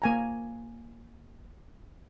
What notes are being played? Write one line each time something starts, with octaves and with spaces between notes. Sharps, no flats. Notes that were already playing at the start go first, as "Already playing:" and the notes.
A#3 G#5 A#5